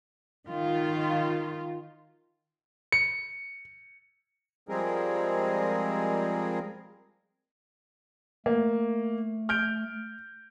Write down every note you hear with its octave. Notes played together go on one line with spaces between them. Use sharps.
D#3 F4
C#7
F3 G3 G#3 C4 G#4 A#4
A3 A#3
F6 G6 D7